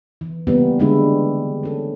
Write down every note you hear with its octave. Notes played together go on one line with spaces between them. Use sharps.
E3
C#3 E3 G3 A#3 B3
D3 G3 G#3 D4 E4
C#4 A4